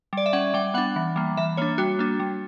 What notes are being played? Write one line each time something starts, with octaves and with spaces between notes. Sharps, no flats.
G3 D5
E5
C#4 F#5
G3 G5
B3 D4 F#5
E3
G3 A#3
E3 E5
A#3 D4 C#5
G3 F#4
A#3 D4
G3